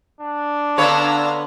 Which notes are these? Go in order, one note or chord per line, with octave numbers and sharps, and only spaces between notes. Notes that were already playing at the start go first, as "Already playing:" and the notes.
D4
D3 B3 C#5 F5 A#5 E6